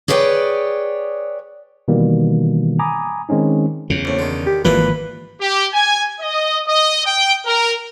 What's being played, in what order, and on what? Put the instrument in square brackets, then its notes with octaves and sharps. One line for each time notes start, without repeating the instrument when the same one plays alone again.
[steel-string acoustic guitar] G#4 B4 C#5 D5 F#5 G5
[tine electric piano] B2 D#3 E3 G3 A#3
G#5 A#5 B5 D6 D#6
D#3 G#3 C4 C#4 D#4
[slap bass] E2 C#3
[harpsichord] A#1 A2
D3 D#3
[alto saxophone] G4
[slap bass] G#1 E3 F3 [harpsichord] A#3 D4 E4 [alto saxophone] B4
[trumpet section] G4
G#5
D#5
D#5
G5
A#4